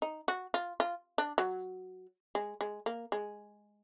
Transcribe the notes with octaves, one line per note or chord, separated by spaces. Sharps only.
D#4
F#4
F4
F4
D4
F#3
G#3
G#3
A#3
G#3